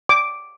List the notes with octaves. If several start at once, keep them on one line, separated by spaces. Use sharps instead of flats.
D6